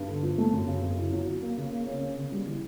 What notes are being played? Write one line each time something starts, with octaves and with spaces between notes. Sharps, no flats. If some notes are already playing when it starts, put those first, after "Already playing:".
Already playing: G2
D3
F3
A3
F#2
C#3
F#2
E4
F#3
F#3
A#3
C#3
A#3
C#4
C#3
C#3
G3
E3